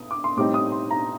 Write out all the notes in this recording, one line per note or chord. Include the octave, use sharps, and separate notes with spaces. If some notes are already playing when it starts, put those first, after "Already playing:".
Already playing: D#6
D6
C6
A2 G3 C4 D#4 D6
D#6
C6
A#5